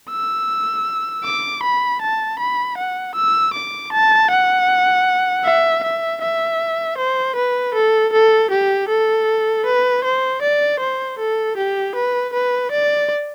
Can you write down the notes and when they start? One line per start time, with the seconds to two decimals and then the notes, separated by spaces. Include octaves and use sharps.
0.10 E6
1.24 D6
1.63 B5
2.01 A5
2.39 B5
2.78 F#5
3.15 E6
3.54 D6
3.92 A5
4.30 F#5
5.44 E5
5.83 E5
6.21 E5
6.98 C5
7.36 B4
7.74 A4
8.13 A4
8.51 G4
8.89 A4
9.66 B4
10.04 C5
10.42 D5
10.80 C5
11.19 A4
11.57 G4
11.95 B4
12.33 B4
12.71 D5